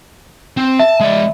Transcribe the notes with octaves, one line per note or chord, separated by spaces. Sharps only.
C4
E5 A5
G#3 D5